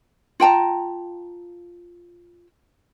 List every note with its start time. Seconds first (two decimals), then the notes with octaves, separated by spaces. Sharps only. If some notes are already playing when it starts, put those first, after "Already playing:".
0.40 F4 G5 A5 A#5